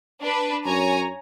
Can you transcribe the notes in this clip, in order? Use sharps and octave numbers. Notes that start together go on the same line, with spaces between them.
D4 B4
F#2 C#5 G#5 A#5